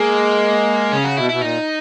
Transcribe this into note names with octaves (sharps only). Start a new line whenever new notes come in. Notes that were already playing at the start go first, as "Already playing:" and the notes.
Already playing: G#3 A#3
C#3 C#4
F#4
B2 E4
B2 E4
A#2 D#4